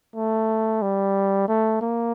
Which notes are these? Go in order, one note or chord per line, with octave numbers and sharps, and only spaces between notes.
A3
G3
A3
A#3